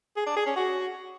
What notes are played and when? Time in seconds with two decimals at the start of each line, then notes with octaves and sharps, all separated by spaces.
0.17 G#4
0.27 D4
0.36 G#4
0.46 C#4
0.56 F#4